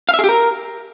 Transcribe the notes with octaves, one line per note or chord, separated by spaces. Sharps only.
F5
E5
G#4
G4
A#4